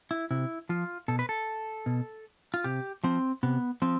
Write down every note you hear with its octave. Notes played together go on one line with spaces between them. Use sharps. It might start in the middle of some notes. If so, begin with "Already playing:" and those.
E4
C3 E4
F3 F4
B2 A4
B4
A4
B2
F4
C3 G4
F3 C4
C3 B3
F3 C4